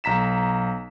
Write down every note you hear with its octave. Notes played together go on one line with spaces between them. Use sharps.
B1 A#5 B6 E7